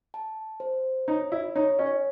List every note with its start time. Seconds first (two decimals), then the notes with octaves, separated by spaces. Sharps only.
0.14 A5
0.60 C5
1.08 D#4 C#5
1.32 E4
1.55 D#4 C#5
1.79 C#4